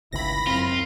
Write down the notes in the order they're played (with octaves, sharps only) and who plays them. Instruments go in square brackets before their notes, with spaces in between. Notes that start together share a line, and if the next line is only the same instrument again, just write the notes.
[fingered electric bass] G1 C#2 D#3 [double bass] E4 [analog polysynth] B5 A#6
[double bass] F#2 [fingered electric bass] C4 [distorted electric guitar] F4